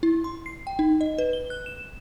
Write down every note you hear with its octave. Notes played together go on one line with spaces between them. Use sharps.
E4
C6
C7
G5
D#4
D#5
B4
G7
F#6
E7